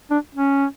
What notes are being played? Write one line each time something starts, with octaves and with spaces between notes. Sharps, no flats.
D4
C#4